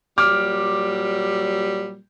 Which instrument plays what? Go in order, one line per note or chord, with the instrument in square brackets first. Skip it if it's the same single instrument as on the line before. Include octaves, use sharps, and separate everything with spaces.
[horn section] A#2 F#3 G3 [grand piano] D6 F6